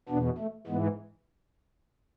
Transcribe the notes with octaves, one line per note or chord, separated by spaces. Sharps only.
E2 B2 B3 D4
A3
G#2 E3 G#3 B3